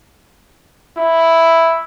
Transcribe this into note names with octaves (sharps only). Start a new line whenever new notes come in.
E4